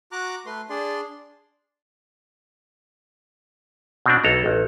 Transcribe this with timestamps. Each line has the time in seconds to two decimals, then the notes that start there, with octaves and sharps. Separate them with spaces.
0.12 F#4 A#5 D6 F#6
0.46 A3 B4 C6
0.70 D4 G#4 D5 C6
4.06 B2 C4 D4
4.24 B1 A4 A#5
4.46 A1